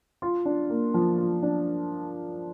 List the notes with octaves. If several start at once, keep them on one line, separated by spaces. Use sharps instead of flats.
F4
D4
A#3
F3
F4
D4